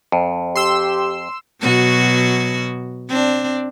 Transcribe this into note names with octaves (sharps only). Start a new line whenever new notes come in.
F2
G4 C6 E6
B2 F#3 F#4
C4 D4